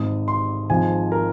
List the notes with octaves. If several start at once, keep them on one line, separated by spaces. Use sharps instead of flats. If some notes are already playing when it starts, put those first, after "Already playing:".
Already playing: G#1 G#2 G#3 D#6
C6
G#1 G#2 F3 G#5
A#4